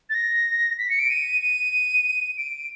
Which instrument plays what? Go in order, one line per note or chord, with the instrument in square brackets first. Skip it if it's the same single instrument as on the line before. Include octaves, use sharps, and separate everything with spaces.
[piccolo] A6
A#6
B6
C#7
D7
D#7
D#7
D7